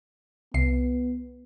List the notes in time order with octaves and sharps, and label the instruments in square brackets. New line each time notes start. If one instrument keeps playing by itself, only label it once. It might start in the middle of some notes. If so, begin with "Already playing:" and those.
[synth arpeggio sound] C2 C7 [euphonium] B3